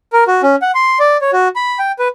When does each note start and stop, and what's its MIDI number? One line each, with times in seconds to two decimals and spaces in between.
0.13 0.24 70
0.27 0.42 66
0.43 0.56 61
0.62 0.72 78
0.75 0.99 84
1.00 1.17 74
1.21 1.31 73
1.33 1.48 66
1.56 1.79 83
1.79 1.92 79
1.99 2.08 71